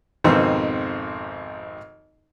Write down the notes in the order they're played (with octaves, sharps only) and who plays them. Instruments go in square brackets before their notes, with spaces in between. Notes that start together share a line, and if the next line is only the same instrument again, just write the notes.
[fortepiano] G#1 F2 B2 D#3 C4